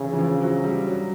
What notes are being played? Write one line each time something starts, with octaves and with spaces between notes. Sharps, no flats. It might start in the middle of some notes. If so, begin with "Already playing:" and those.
Already playing: C#3 E3
E3
F3
F#3
G3
F#3